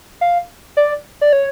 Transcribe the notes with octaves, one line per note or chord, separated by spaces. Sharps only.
F5
D5
D5
C#5